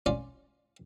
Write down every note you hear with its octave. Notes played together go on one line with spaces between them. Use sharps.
C#4 F4 D5